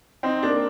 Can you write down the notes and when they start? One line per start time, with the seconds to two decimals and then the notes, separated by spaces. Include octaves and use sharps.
0.23 C4 D#4
0.43 A#3 D4